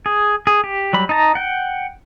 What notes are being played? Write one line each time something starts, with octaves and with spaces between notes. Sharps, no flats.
G#4
G#4
G4
F#3 G3 B5
D#4 A5 A#5
F#5 G5